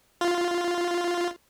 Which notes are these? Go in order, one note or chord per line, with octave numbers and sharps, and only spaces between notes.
F4